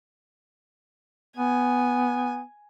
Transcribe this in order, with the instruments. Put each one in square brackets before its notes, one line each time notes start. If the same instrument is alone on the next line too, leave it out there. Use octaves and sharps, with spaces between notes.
[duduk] B3 [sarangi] G#5